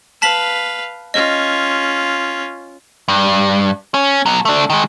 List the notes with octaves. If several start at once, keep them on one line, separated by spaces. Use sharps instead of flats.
B4 F5 A5 B6 F#7
C#4 F4 D#5
G2
C#4
B2 F#3
A3 D4
D#3 G#3